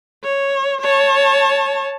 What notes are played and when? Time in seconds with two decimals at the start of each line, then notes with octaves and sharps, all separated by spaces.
0.24 C#5
0.81 C#5 A5